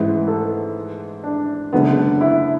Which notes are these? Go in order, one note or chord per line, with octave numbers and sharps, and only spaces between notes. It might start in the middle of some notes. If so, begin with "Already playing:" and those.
Already playing: A1 G#2 E3 G#3 B4
A4
D4
F#1 F#2 D3 G#3 B3
D4
E4